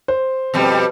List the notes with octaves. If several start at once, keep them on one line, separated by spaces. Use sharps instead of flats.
C5
F2 B2 G3